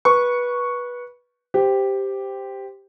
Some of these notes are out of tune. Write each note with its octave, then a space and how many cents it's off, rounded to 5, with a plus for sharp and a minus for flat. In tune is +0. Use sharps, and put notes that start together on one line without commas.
B4 -20 C#6 +0
G4 +0 C5 -10